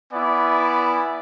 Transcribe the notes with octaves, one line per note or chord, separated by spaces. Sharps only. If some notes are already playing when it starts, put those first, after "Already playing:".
B3 E4 D5 G#5